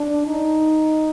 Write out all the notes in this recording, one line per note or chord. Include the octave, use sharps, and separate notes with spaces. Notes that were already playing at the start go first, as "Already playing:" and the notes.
Already playing: D4
D#4